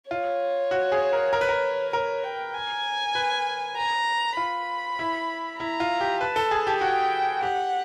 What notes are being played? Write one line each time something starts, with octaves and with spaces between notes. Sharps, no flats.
F4 C#5
F#4
G#4
A#4
A#4
B4
A#4
A#4 C#5
G5
G#5
B4
A#5
F4 B5
E4
E4 A#5
F4
G4
B4 A5
A4
G#4
G4
F#4 G5
G4 F#5